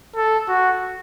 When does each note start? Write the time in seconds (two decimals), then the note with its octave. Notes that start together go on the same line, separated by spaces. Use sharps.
0.16 A4
0.48 F#4